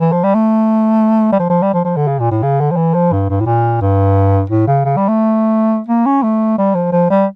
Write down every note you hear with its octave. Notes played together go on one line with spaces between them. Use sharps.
E3
F3
G3
A3
G3
F3
F3
G3
F3
F3
D3
C#3
A#2
A2
C#3
D3
F3
E3
F3
G2
G2
A2
A#2
G2
A2
C#3
C#3
G3
A3
A#3
C#4
A3
G3
F3
F3
G3